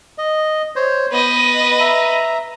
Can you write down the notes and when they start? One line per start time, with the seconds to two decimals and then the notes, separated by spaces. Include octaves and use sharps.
0.18 D#5
0.76 C5 C#5
1.12 B3 B4 D#5
1.80 E5 A#5